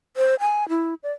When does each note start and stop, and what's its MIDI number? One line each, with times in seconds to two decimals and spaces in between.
0.17 0.35 72
0.40 0.68 80
0.69 0.94 64
1.03 1.12 74